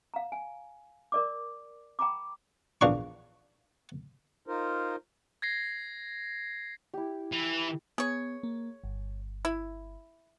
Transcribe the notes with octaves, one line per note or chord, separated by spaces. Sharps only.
F5 A#5
G#5
A#4 D5 D6
G5 A#5 B5 D6
A#1 E2 D4 F5 F#5 C#6
D#4 F4 A#4 C5
G#6 A#6 C7
E4 G4
E3
B3 G#4 C#5
A#3
G1
E4